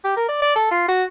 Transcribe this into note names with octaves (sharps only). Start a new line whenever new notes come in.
G4
A#4
D5
D5
A4
F4
F#4